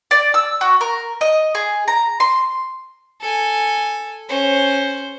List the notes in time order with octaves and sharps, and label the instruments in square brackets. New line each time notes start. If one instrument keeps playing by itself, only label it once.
[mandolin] D5
E6
F#4
A#4
D#5
G#4
A#5
C6
[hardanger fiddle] A4 G#5
C#4 C5